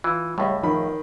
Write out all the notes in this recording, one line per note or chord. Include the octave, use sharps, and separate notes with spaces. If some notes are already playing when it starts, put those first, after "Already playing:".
E3 F4
C#2 A2 G3
D#3 F3 B5